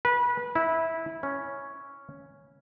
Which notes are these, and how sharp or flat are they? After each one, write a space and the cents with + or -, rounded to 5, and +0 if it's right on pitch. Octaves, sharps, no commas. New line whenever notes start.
B4 -25
E4 -15
C#4 +0